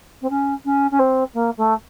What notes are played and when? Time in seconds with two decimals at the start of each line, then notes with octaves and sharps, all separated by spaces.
0.21 C4
0.29 C#4
0.65 C#4
0.91 C#4
0.99 C4
1.34 A#3
1.57 A3